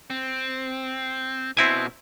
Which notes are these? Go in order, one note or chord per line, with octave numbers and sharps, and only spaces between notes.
C4
B2 C4 E4 G#5